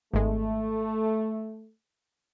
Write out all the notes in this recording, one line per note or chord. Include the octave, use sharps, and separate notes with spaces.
G#1 G#3 A3